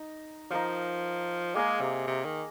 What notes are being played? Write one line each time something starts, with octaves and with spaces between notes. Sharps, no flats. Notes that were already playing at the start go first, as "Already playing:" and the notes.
Already playing: D#4
F3 D#4 A#4 F5
G#3 A#3 G#4 D#5
C3
C3
D#3